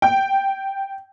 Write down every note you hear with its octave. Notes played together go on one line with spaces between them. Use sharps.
G5